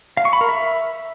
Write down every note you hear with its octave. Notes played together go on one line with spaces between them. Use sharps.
F5
C#6
B5
A#4
E5